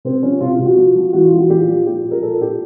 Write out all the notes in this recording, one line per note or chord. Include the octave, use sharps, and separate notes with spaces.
C3 C4
F3 C#4
C3 F4
F4
C3
F#4
F3 F#4
F3
E3 F#4
F4
E3
F#4
A#2 G4
F3
A#2 G4
A#2
A#4
A#2 A4
A#2 G4